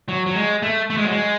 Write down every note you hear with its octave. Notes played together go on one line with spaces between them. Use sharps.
F#3
F#3
G#3
A3
A3
G#3
F#3
G#3